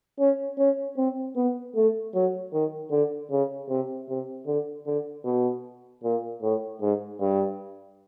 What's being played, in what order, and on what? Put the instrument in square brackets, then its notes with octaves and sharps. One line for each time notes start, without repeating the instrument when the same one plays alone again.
[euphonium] C#4
C#4
C4
B3
A3
F#3
D#3
D3
C#3
C3
C3
D3
D3
B2
A#2
A2
G#2
G2